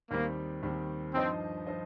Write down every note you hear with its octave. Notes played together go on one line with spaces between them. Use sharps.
D#2 D#3 G3 A#3 C4
D#2 D#3 G3 C4
G2 F3 C4 D#4 C5 D#5
F3 D#4 C5 D#5